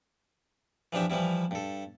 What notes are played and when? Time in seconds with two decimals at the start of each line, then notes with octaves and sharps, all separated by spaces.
0.93 E3 F3 D4 G4 E5
1.10 E3 F3 G3 E4
1.51 G2 A4